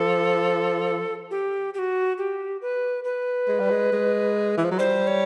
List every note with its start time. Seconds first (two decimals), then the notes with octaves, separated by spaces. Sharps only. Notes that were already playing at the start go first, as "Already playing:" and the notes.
Already playing: F3 A4
1.31 G4
1.74 G4
1.79 F#4
2.18 G4
2.62 B4
3.04 B4
3.48 G#3
3.60 G3
3.71 G#3
3.92 G#3
4.58 E3
4.65 F3
4.71 F#3
4.79 G3 C5
5.07 C#5